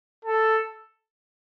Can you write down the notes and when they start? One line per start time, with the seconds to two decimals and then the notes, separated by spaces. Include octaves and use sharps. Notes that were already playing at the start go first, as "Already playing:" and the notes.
0.25 A4